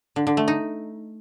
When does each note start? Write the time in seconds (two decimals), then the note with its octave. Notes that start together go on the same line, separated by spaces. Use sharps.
0.16 D3
0.27 D3
0.37 A3
0.48 D#4